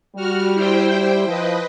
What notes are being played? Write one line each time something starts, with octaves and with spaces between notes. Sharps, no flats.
G3 F#4 F6
E4 C5 G5
F3 B4 D#5